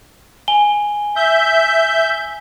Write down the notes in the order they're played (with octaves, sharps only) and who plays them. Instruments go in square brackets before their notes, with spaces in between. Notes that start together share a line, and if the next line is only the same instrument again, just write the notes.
[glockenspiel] G#5 G7
[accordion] E5 G6 [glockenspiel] E6